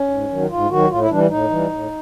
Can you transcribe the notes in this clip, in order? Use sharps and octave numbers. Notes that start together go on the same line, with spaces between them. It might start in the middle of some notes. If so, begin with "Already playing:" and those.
Already playing: C#4
G#2
D#3 F#3
G#2 F4
D#3 F#3 F#4
A2 F4
E4
E3 G3 D4
A2 D#4
E3 G3
A2